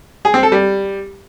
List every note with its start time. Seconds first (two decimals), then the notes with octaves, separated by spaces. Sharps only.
0.25 G#4
0.34 C4
0.43 A4
0.52 G3